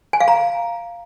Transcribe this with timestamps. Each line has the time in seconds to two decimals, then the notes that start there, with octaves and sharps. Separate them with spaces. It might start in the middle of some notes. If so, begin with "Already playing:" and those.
0.13 G#5
0.20 F5
0.28 A#5